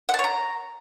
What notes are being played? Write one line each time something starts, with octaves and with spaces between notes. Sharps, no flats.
F#5
A5
C#5
A#5